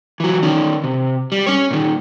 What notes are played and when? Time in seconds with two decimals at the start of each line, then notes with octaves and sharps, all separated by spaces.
0.20 E3 F#3
0.43 D#3 C#4
0.84 C3
1.32 G3
1.47 C#4 C#5
1.70 A#2 D#3